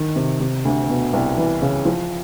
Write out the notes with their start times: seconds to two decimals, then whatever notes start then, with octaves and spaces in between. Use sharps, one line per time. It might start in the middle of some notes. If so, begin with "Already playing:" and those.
Already playing: D#3
0.16 C3
0.40 C3
0.65 D2
0.89 B2
1.13 C2
1.37 E3
1.62 C#3
1.85 F3